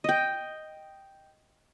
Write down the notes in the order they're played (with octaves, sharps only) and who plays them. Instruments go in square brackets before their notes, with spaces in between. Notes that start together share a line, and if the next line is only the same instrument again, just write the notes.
[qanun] D#5 G5